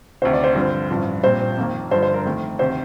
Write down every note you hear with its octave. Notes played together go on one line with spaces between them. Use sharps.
D2 C3 D#3 C5
D5
C5
G2 D3 F3 C4
A1 G2 F3
A#1 A#2 G3 C4 C5
F2 D#3 A#3
G2 D3 F3 C5
C5
A#4
F2 D#3 A3
D2 C3 D#3 C5